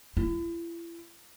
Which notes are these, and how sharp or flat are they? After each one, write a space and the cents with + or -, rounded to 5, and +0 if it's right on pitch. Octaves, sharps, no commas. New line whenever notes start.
E4 +40